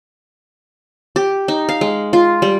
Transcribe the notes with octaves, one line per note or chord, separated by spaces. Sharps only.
G4
D#4
F5
G#3
F4
G3